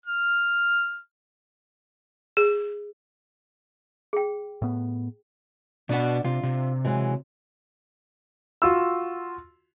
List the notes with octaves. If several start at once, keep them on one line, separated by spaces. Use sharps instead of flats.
F6
G#4
G#4 G5
A2 B3
B2 D4 F#4 F#5
C3 F4
C3
E3 F#3 G#3
F4 F#4 C6 E6